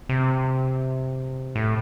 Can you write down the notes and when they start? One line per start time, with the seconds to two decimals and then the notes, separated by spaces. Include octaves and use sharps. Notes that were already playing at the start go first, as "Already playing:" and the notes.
0.09 C3
1.56 A2